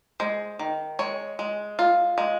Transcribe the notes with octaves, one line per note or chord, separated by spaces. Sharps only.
G#3 C5
D#3
G#3 C#5
G#3
F4
G#3